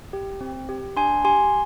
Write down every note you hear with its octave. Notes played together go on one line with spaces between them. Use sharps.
G4
C4
G4
D4 G#5 C6
G4 G#5 C6